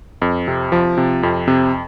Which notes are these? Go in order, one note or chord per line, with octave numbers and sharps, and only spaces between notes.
F2
C3
F3
C3
F2
C3